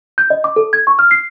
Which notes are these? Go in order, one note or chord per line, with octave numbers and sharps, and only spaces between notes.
G6
D#5
D6
A4
G#6
C#6
F6
C7